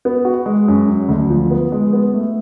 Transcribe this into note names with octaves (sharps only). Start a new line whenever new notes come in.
B3
F#4
G#3
F#2
F#3
D2
F3
B3
G#3
B3
A3